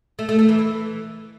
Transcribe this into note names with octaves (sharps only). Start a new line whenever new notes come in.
A3
A3
A3
E3
E3